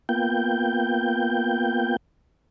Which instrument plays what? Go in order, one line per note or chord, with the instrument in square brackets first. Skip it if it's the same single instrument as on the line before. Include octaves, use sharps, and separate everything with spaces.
[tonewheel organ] A#3 B3 F4 G5 G6